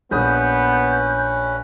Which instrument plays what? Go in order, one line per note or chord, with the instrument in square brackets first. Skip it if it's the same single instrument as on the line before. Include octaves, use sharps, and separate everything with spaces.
[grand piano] A#1 D#6 [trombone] B3 [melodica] C#4 B4 [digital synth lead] G6